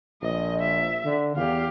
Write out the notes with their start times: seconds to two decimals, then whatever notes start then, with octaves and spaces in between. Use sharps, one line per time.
0.22 A#1 D#5
0.61 E5
1.05 D3
1.36 E2 G4 F5